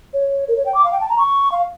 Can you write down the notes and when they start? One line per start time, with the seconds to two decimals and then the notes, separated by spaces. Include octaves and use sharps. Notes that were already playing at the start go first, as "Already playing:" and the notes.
0.14 C#5
0.48 A#4
0.57 C#5
0.66 G5
0.74 D6
0.84 F5
0.92 G5
1.01 A5
1.09 A#5
1.18 C#6
1.52 F5